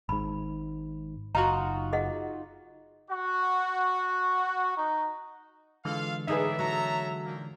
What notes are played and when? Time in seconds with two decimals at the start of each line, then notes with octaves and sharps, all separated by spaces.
0.09 G#1 G#2 B5
1.35 F#1 D#4 F4 F#4 A#5
1.93 G#4 D#5 F#5
3.10 F#4
4.75 D#4
5.85 D3 E3 G#3 F4 A4 F5
6.28 A2 D4 D#4 G#4 B4 E5
6.59 F#3 A4 C#5 A#5
7.24 A#2 D#3 A#3